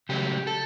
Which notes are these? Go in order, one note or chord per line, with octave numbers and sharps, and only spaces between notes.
C#3 F#3 A3 G4
A4